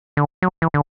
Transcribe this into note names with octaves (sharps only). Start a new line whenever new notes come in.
D3
F#3
E3
D3